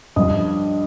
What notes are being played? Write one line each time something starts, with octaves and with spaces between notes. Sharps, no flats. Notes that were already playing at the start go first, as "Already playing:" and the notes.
G2 F3 D#5 D#6